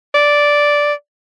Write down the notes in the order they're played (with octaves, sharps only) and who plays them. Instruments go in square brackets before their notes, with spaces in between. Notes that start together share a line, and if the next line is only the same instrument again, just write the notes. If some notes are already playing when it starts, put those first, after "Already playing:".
[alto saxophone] D5